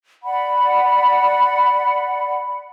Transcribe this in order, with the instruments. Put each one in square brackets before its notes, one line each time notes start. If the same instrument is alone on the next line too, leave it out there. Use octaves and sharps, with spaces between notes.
[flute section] D5 F#5 B5